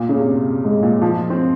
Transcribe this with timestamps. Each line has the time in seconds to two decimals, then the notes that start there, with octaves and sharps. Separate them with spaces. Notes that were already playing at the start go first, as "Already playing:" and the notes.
Already playing: A#2
0.09 C#3
0.17 C3
0.65 G#2
0.83 A#2
1.02 F3
1.30 C4